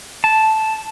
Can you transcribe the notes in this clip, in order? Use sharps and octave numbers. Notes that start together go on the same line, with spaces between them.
A5